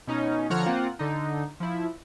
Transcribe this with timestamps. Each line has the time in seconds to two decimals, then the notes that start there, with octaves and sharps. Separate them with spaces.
0.07 B2 C#4 D#4
0.50 D3 F3 C#5 F#5 A#5 F6
0.65 A#3 C4 F4 F#5
0.99 D3 D#4
1.60 F3 E4